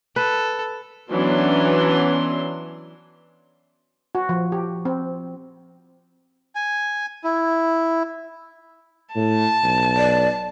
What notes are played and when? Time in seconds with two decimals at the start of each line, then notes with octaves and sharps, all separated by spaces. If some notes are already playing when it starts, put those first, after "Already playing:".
0.16 A4 B4
1.10 E3 F#3 B3 C#4 D4 C6
4.15 F#4
4.29 F3
4.52 G4
4.85 C4
6.55 G#5
7.24 E4
9.16 A2 A5
9.64 B1
9.97 D5